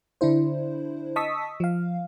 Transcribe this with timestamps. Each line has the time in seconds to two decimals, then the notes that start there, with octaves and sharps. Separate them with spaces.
0.21 D3 D4 E4 C5
1.16 D#5 A5 C#6 D#6 E6 B6
1.60 F3 F5